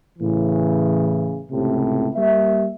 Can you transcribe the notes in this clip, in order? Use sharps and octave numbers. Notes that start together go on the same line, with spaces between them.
A2 C#3 E3
C#2 A2 C3
G3 A#3 E5